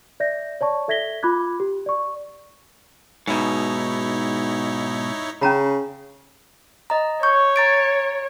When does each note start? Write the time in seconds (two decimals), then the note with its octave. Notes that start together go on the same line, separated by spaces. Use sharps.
0.20 D5 E5 G6 A#6
0.61 C#5 D5 A5 C#6
0.88 A4 E5 G#6 A#6 B6 G7
1.23 F4 B5 D6 F#6 G#6
1.60 G4
1.86 D5 C#6
3.27 G#2 B2 D#4 E4 C#5
5.41 C#3 C#4 A#5 B5
6.90 D#5 A#5
7.23 C#5 C#6 G6
7.56 A#5 A6 D7